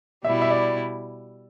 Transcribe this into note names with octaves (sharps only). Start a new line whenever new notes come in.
B2 G3 E4 E5
E5
D5